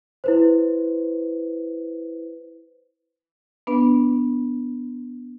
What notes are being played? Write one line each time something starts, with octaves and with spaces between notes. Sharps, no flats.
E4 B4 C5
B3 D4 B4